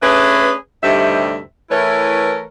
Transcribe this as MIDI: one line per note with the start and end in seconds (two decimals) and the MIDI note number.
0.02 0.53 57
0.02 0.53 61
0.02 0.53 62
0.02 0.53 68
0.02 0.53 71
0.84 1.41 38
0.84 1.41 43
0.84 1.41 48
0.84 1.41 55
0.84 1.41 63
0.84 1.41 76
1.71 2.43 52
1.71 2.43 57
1.71 2.43 64
1.71 2.43 70
1.71 2.43 71
1.71 2.43 73